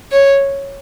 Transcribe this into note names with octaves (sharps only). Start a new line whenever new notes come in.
C#5